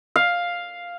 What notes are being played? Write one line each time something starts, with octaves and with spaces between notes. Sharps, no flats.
F5